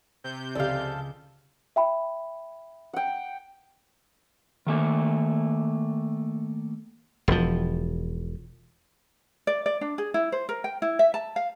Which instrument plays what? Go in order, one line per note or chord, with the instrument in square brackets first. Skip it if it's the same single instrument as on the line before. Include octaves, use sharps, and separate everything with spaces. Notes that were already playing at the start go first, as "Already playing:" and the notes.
[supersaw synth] C3 G6
[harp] C#2 C#3 [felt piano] G4 D5 [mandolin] A4 F5
[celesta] E5 G5 B5
[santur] F#5 G5
[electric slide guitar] D#3 A3 A#3
[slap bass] E1 F3
[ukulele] D5
D5
D4
G#4
E4
C5
A#4
G5
E4
E5
A5
F5